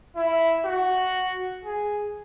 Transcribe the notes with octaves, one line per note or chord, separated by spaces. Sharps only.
E4
F#4
G#4